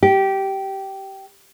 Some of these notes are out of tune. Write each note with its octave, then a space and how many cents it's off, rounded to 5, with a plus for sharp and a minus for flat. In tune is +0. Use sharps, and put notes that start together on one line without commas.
G4 -15